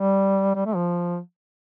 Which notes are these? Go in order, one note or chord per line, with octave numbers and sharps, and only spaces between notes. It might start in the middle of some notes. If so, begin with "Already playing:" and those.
Already playing: G3
G3
A3
F3